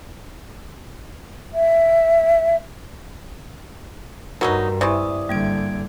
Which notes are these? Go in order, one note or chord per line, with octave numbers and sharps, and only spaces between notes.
E5
G2 B2 F#3 D#4 F#4 A#4 A#5
C3 E3 E4 D5 C#6 D#6
G#1 D3 G3 A#3 G#6 D7